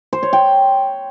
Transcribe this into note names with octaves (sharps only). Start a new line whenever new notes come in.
C5
C#5
G5